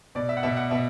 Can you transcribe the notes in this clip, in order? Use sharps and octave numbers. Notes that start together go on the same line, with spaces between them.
B2 D5
E5
F#5
B2 E5
F#5
B2 E5